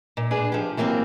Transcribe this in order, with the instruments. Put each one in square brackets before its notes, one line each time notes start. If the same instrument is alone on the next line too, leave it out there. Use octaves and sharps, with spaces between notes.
[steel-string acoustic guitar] A#2
D4 G#4 B4
F3 G4
E3 F#3 A#3 C4 G4